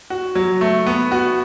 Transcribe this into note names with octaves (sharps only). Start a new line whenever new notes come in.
F#4
F#3
A3
B3
F#4